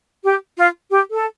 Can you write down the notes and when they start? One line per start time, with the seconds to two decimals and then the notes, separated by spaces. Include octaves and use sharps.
0.24 G4
0.57 F4
0.89 G4
1.11 A4